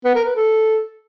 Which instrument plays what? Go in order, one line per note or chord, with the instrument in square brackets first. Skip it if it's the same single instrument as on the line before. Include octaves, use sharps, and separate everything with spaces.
[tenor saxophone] B3
A#4
B4
A4